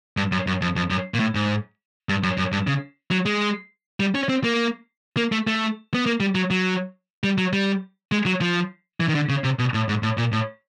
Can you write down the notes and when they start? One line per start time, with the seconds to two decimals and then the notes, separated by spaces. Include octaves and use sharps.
0.17 G2
0.32 F#2
0.47 F#2
0.62 F2
0.76 F2
0.90 F#2
1.14 A#2
1.20 A2
1.35 G#2
2.09 G2
2.23 F#2
2.38 F#2
2.52 G2
2.67 C#3
3.11 F#3
3.26 G#3
4.00 G3
4.15 C#4
4.29 C4
4.44 A#3
5.17 A#3
5.32 A3
5.47 A3
5.94 B3
6.06 A#3
6.20 G3
6.35 F#3
6.50 F#3
7.24 G3
7.38 F#3
7.53 G3
8.12 G#3
8.26 F#3
8.41 F3
9.00 E3
9.09 D#3
9.15 D3
9.29 C#3
9.44 C3
9.59 B2
9.74 A2
9.89 G#2
10.03 A2
10.18 A#2
10.32 A2